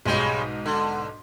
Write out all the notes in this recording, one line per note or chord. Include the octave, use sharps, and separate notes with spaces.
B1 G#2 C#3 G3 G#3
D3